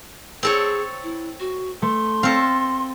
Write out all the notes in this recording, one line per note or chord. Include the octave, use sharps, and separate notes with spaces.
C4 G#4 A4 C#5
E4
F#4
A3 C6
C4 A4 F5 A#6